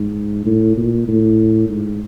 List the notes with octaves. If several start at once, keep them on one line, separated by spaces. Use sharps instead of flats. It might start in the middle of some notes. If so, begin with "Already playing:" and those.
Already playing: G#2
A2
A#2
A2
G#2